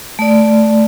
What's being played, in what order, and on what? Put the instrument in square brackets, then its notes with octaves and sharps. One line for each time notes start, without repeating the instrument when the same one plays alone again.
[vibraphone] A3 D5